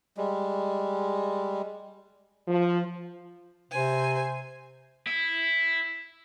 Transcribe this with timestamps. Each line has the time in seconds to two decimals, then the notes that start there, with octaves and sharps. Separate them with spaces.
0.17 G3 G#3
2.48 F3
3.72 C3 C5 G#5
5.07 E4